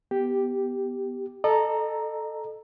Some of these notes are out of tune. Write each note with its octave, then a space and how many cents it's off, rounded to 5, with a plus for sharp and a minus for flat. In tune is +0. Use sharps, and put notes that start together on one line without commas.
B3 +0 G4 +0
A4 +0 D#5 -40 A#5 +0